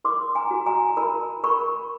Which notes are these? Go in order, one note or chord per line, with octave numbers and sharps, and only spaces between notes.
A#4 C6 D6
G#5 A#5
F#4
G#5 A#5
A#4 A5 B5
A#4 B5 C#6